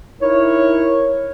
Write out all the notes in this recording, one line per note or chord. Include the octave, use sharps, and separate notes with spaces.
D#4 E4 A#4 C#5